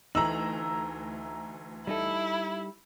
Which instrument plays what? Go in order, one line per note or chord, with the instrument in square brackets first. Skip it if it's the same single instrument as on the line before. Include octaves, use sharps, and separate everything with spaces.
[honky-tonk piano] D2 E3 F#7 [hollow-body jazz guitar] A3 D#4 [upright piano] A#5 E6
[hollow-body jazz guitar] G3 D#4 A4 [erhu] E4